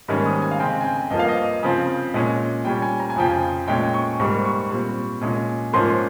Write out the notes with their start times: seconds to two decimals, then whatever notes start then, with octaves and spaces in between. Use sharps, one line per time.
0.08 G#2 D#3 G3 A#3 C#4
0.26 D#6
0.42 G#5
0.51 F5
0.60 C#3 G#3 C4 G5
0.81 G#5
0.85 G5
1.10 G2 F3 A#3 D#5
1.19 F5
1.28 D#5
1.63 C#3 F3 C4
2.14 A#2 G#3 C#4
2.65 A#2 G3 C#4 G5
2.82 G#5
3.00 A#5
3.10 G#5
3.16 F2 C#3 F3 G5
3.30 G#5
3.68 A#2 G#3 C#4 G5
3.94 C#6
4.19 G#2 G3 A#3 C#6
4.45 C#6
4.71 A#2 G3 C4
5.21 A#2 G#3 C#4
5.73 G#2 F3 A#3 C#4 C6